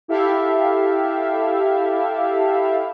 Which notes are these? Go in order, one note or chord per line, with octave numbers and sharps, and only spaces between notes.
E4 G4 A4 E5 F5